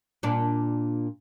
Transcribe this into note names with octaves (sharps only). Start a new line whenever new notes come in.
A#2 D4